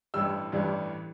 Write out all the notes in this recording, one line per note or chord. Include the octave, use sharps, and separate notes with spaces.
A1 G2 E3 G3 E6
A1 G2 E3 G3